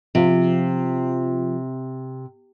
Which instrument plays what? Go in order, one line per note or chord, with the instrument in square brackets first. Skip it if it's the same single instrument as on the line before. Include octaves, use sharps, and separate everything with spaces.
[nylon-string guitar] C3 [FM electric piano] F3 F4